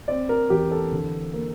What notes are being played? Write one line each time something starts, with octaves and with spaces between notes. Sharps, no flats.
C4 D5
A#4
E2 G4
A4
D3
A#3